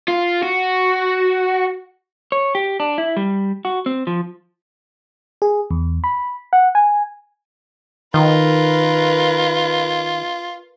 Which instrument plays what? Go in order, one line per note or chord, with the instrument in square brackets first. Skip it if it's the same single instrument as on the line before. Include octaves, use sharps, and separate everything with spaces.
[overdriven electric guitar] F4
F#4
[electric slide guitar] C#5
G4
D4
E4
G3
F#4
C4
F3
[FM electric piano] G#4
E2
B5
F#5
G#5
[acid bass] D#3 [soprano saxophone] F4 [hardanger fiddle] A#4 B4